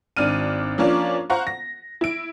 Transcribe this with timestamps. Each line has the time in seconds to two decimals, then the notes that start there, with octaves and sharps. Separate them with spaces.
0.17 G#1 D4 F6 D#7
0.78 F3 A#3 C#4 D4 F4
1.30 C5 F5 F#5 A#5 C#6
1.47 A#6
2.01 E4 D7